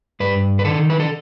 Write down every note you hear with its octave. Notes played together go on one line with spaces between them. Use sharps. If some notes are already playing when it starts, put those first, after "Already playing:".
G2 B4
B4
D#3 A4
B4
A4